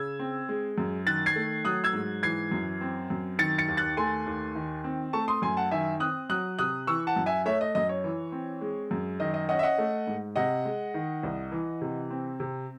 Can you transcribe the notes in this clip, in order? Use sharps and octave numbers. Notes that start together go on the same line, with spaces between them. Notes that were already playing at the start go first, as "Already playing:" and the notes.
Already playing: C#3 E6 G#6
C4
G#3
F#2
D#3 F#6 A6
G#6 C7
A3
F#3 D#6 F#6
E6 G#6
G#2
E3 G#6 C7
F#2
C4
F#2
D#3 A6 C#7
A6 C#7
D#2
F#6 A6
A3 G#5 C6
D#2
D#3
C4
A3 A5 C#6
C6 D#6
F#2 G#5 C6
F#5 A5
D#3 E5 G#5
C4 D#6 F#6
F#3 D#6 F#6
C3 D#6 F#6
E3 C#6 E6
F#5 A5
F#2
E5 G#5
A3 C#5 E5
D#5
F#2 D#5
C#5
E3
C4
G#3
F#2
D#3 D#5
D#5
C#4 D#5 F#5
E5
D#5 F#5
A3
G#2
C3 D#5 F#5
G#3
D#3
C2
E3
C3
C4
C3